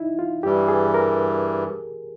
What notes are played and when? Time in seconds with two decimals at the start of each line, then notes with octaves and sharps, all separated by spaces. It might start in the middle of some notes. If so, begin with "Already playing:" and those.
Already playing: D#4 E4
0.19 F4
0.43 G2 E3 G3 G4
0.68 G#4
0.94 A#4